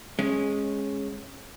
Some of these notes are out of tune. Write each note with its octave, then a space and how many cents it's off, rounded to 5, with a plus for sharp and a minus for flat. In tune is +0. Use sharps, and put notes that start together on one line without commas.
G#3 +0 C#4 -15